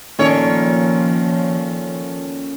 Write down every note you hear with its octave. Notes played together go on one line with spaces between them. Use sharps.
A#2 D#3 F3 C#4 A4 C#5